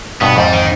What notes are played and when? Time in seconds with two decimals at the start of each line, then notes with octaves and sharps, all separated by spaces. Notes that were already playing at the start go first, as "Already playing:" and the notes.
0.21 G2 B2 B3
0.37 F2 G#2 G3
0.52 D#3